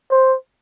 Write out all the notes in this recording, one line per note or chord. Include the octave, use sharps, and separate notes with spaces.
C5